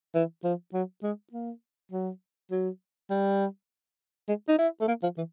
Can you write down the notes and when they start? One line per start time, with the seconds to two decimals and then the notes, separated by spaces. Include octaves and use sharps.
0.14 E3
0.44 F3
0.73 F#3
1.03 G#3
1.33 A#3
1.92 F#3
2.51 F#3
3.10 G3
4.28 G#3
4.48 D#4
4.59 E4
4.81 A3
4.88 A#3
5.03 F3
5.17 E3